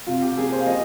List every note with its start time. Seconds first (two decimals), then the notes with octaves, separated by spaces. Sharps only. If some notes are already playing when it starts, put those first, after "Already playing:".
0.07 C3 F4
0.22 G4
0.36 F3 A#3 C#4 G#4
0.52 C5
0.59 F5
0.66 F3 D#5